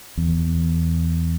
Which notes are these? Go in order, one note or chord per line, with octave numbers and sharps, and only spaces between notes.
E2